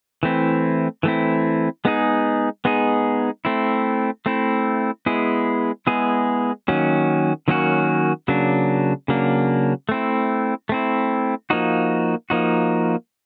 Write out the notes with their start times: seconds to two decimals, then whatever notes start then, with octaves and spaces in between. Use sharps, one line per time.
0.23 E3 A3 C4 E4
1.03 E3 A3 C4 E4
1.85 G#3 B3 D#4 G#4
2.65 G#3 B3 D#4 G#4
3.45 A3 C4 E4
4.26 A3 C4 E4
5.06 G#3 B3 E4 G#4
5.87 G#3 B3 E4 G#4
6.68 D#3 F#3 A#3 C#4 F#4
7.48 D#3 F#3 A#3 C#4 F#4
8.28 C#3 F#3 A#3 D4
9.08 C#3 F#3 A#3 D4
9.89 A3 C4 E4
10.69 A3 C4 E4
11.50 F3 A#3 D#4 F#4
12.30 F3 A#3 D#4 F#4